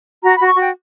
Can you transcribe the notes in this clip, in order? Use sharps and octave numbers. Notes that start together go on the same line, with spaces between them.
F#4 A#5
F#4 B5
C#6
F#4 G5